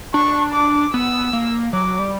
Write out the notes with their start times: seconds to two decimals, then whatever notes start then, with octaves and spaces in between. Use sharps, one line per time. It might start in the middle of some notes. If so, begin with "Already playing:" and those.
0.14 D4 C#6
0.54 D6
0.94 B3 E6
1.33 A#3
1.73 F#3 D6
1.99 G3